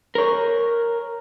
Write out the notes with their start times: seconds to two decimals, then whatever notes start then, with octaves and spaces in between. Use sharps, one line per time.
0.15 A#4 C#5